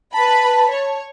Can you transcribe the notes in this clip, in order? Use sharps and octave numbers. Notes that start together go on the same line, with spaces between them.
B4 A5 B5
C#5